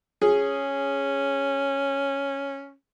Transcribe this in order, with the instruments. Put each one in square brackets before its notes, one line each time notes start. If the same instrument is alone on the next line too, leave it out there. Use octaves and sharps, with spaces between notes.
[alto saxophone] C#4 [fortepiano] G#4